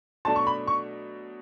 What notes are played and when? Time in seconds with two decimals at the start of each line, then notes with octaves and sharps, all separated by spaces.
0.25 B2 F#3 A3 D4 A5
0.36 C#6
0.47 B5
0.67 C#6